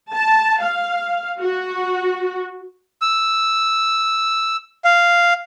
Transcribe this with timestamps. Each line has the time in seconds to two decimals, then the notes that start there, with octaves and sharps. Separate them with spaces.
0.13 A5
0.63 F5
1.40 F#4
3.02 E6
4.85 F5